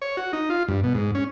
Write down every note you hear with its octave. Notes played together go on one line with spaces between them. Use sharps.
C#5
F#4
D#4
F4
G2
B2
G#2
C#4